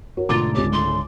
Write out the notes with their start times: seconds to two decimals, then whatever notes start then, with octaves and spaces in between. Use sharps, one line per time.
0.17 F#4 A#4 C#5
0.29 G#2 B2 D3 A3 F4 A#5 D6 A6
0.54 C#2 G4 C#5
0.72 G#3 A3 C6